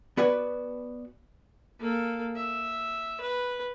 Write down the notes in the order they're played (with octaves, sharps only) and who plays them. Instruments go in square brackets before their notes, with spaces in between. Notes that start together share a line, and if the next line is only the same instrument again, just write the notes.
[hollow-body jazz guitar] B3 F#4 B4 D5 G#5
[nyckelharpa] A#3 A4
E5
B4